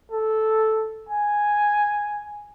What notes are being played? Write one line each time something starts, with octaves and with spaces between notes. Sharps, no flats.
A4
G#5